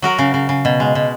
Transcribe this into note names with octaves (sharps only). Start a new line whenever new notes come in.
F#3 F#4 A#4
C#3
C#3
C#3
B2
G#3
B2